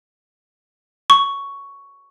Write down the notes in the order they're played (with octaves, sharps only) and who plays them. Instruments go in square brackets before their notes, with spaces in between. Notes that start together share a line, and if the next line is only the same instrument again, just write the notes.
[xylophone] C#6